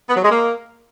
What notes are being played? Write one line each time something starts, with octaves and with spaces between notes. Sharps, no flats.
B3
F#3
G#3
A#3